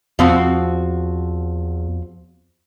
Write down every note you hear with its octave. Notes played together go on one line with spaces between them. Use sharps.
E2 F3 C4 F#4